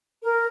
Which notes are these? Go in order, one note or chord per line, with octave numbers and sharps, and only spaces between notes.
A#4